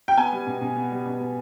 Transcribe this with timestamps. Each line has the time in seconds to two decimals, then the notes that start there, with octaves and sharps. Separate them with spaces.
0.08 G5
0.17 B3 G#5
0.32 G3
0.47 B2
0.61 B2
0.76 B3
0.92 G3
1.06 B2
1.20 B2